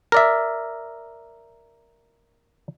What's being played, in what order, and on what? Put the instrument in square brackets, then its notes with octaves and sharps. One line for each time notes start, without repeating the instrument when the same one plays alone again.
[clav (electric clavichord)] A#4 D5 E5